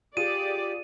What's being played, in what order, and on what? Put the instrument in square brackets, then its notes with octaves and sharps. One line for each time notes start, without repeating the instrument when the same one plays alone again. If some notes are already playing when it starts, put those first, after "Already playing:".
[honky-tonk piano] F4 G#4 [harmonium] G4 [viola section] D5 [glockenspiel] D#7